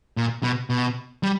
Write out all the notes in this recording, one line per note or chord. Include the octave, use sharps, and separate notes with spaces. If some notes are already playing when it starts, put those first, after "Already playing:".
A#2
B2
B2
G3